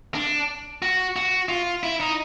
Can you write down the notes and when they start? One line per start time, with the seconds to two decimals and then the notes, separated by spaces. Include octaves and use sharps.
0.15 D4
0.82 F#4
1.16 F#4
1.49 F4
1.83 E4
2.00 D#4